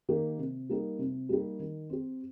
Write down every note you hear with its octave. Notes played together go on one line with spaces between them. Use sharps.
D#3 A#3 G4
C3
G3 A#3 D#4 G4
C3
G3 A#3 D#4 G4
D#3
C4 G4